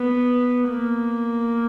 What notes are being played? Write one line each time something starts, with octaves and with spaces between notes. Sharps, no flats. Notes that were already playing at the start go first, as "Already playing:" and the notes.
Already playing: B3
A#3